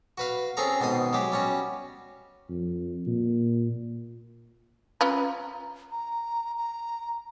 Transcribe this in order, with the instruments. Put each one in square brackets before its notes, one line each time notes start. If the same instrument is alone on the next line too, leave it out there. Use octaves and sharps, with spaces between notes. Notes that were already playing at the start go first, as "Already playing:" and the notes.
[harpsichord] F#4 B4 F5
C4 C#4 G#4 A4 A#5
G#2 B2 D#3 C5 D#6
F#3 G#3 G4
G3 C#4 F#4
[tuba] F2
A#2
[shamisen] C#4 F4 B4 [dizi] A#5
[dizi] A#5
A#5